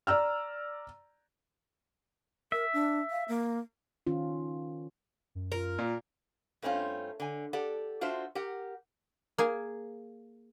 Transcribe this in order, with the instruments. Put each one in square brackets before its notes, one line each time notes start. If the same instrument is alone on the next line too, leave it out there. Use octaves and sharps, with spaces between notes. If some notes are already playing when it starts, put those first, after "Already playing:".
[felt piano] D5 A#5 E6 F6
[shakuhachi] A#4 [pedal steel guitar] E5
[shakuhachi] D4
F5
A#3
[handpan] D#3 C#4 F4
[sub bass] F#2
[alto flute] F4 [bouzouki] A#4
[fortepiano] A#2
[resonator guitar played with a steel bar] G2 A3 C4 C#4 F4
D3 G#5
G4 A4 D5 F#5
D4 F4 F#4 C5 E5
G4 A#4 F#5
[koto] A#3 G#4 G#5